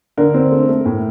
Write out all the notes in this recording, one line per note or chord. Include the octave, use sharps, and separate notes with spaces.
D3 A#4
C4
A3
A3
A2